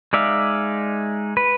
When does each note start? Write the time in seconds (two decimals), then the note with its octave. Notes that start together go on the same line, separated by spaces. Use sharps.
0.13 G#3 D#4 D5 E5 F5
1.37 B4